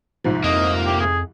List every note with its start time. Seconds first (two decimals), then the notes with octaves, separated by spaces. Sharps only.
0.24 C2 G#2 F3
0.44 F2 A#3 D#5
0.86 G4
1.00 G#4